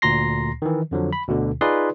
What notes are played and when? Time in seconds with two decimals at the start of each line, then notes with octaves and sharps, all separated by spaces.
0.02 D2 A#2 A#5 C6 A#6 C7
0.62 D#3 E3
0.91 F2 D3 F3 F#3
1.13 B5
1.27 D2 B2 D3
1.61 D#4 F4 G#4 B4 D5 C6